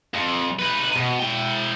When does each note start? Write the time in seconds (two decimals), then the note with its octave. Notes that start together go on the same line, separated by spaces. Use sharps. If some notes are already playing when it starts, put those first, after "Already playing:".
0.14 F2
0.59 D#4 B4
0.96 B2
1.19 E4 G5